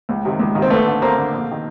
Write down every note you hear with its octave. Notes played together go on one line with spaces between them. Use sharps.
C#2
C3 D#3
C#2
C3 D#3
C4
D2 A3 B3
D3
D2 A#3 C4
D3
A#1
D#3